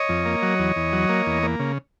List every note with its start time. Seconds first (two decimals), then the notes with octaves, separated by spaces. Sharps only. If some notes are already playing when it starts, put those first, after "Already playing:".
Already playing: C#5 D#5
0.09 F2
0.25 A#3
0.42 F#3
0.59 E2
0.76 E2
0.93 F#3
1.09 A#3
1.26 E2
1.43 A#3
1.60 C#3